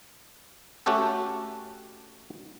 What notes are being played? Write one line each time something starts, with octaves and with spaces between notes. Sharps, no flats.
A3 C#4 F#4 G4 A4